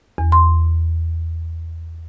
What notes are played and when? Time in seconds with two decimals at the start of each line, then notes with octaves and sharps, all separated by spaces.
0.18 E2
0.32 C6